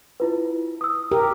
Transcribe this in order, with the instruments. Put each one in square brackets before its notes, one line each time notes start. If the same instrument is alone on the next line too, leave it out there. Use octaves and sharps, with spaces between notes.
[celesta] E4 F4 B4
D#6 E6
[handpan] G4 A#4